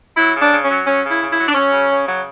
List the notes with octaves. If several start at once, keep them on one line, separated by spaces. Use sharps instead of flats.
F#3 E4
C#3
D4
C#3
C#4
F#3
F#3 C#4
C#3
E4
C#3
E4
F#3
D4
F#3 C#4
C#3
C#3
F#3